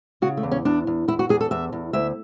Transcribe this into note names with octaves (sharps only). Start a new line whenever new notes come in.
C#3 F#4
A3
E2
C#4
E2 D4
E2
E2 E4
F#4
E2 G#4
A4
E2 E5
E2
D2 E5